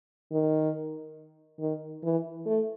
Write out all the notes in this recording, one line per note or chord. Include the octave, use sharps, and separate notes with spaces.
D#3
D#3
E3
A3